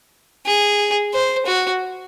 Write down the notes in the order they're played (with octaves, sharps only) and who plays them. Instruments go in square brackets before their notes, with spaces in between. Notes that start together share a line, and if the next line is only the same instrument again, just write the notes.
[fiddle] G#4
C5
F#4